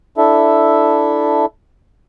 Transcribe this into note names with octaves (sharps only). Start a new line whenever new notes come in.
D4 E4 A4 E5